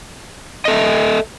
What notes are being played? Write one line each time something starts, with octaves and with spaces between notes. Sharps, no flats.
A4 D#5 E5